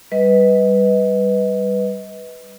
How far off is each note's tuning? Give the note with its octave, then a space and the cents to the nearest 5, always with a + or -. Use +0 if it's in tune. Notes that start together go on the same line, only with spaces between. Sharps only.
G3 +0 B4 +0 D#5 +30